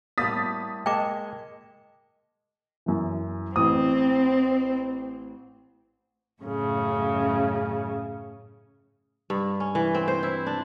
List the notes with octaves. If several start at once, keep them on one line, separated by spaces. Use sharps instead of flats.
A2 G3 A#3 D#6 A6 B6
G#3 A#3 G#4 D#5 G5 A5 D6
F#2 E3
A1 C4 D#6
F#2 A2 C#3
G2
C#4
E3
C4
C5
E4
D4